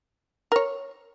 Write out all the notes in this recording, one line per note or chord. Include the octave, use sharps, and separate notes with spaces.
A#4 C#5